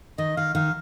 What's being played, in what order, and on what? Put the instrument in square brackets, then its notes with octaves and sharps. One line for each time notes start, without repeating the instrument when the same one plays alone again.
[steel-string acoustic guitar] D#3 [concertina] D#5
[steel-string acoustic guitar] D#3 [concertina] F5
[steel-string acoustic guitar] D#3 [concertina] F5